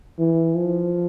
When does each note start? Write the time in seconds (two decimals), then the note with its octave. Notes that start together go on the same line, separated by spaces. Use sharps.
0.19 E3
0.56 F3